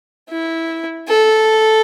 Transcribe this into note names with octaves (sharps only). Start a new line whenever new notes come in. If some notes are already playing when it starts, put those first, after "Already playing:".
E4
A4